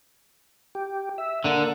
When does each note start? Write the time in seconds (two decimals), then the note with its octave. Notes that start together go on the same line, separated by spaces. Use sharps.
0.75 G4
1.18 E5
1.45 D3 A#3